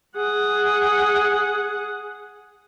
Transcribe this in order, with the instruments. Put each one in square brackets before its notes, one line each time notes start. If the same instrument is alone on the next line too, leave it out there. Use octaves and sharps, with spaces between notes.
[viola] G#4 F#5